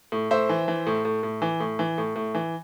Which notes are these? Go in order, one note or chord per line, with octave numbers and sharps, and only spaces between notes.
A2
A2 C5 E5
E3
E3
A2
A2
A2
E3
A2
E3
A2
A2
E3